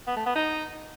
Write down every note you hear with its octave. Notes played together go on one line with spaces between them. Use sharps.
B3
A3
B3
D#4